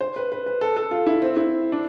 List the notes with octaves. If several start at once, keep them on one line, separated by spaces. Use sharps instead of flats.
C5
B4
B4
B4
A4
A4
F4
E4
C4
E4
D4